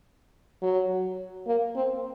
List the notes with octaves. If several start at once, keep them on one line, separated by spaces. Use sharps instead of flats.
F#3
A#3
C4